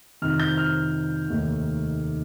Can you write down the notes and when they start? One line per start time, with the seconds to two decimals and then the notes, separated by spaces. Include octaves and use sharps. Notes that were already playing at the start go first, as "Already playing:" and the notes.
0.22 F2 C3 D#3 F6
0.40 G6
0.58 F6
1.28 F1 D#2 D#3 A3